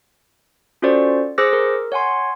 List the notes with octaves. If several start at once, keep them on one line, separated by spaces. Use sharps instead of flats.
C#4 F4 F#4 A4 C5 D5
G#4 C5 D6 E6 F#6 A#6
A#4
C#5 F#5 G#5 C6